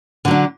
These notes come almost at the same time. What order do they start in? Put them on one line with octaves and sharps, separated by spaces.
D3 F#3 D4